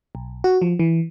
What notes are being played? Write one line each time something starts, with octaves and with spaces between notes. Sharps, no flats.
B1
F#4
F3
E3